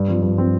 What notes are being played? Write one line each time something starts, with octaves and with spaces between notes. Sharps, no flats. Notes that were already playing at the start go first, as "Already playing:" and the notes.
Already playing: G2
F3 C4
G2
F3 C4